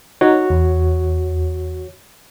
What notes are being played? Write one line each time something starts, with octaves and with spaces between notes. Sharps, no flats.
D#4 F#4 C#5
E2